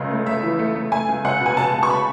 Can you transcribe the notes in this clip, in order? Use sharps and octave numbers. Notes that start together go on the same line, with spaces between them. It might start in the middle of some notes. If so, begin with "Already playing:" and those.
Already playing: C#2 C#3 A3 D#5
A3
A3 E5
E3
A3
A3
A3 G#5
C#2
C#2 F#5
B2 G#5
B2 A5
C#2
C#6
B5